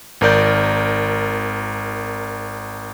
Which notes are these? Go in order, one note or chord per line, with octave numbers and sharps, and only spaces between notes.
G#1 A#4 D5 G6